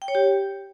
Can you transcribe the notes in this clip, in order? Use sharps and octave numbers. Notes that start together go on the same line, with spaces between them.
G5
C#5
G4